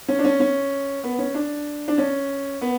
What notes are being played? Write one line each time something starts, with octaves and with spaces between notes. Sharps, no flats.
C#4
D4
C#4
C#4
B3
C#4
D4
D4
C#4
B3